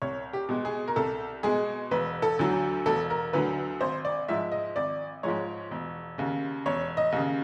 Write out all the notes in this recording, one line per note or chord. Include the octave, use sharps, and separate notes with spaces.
C2 C#5
G4
B2 G#3
G#4
A#4
C2 A4
B2 G#3 G#4
E1 B4
A4
D2 D3 F#3
E1 A4
A#4
D2 D3 F#3 B4
G#1 C5
D5
G#2 F3 G#3 E5
D#5
G#1 D5
G#2 F3 G#3 C#5
E1
D#2 C#3
E1 C#5
D#5
D#2 C#3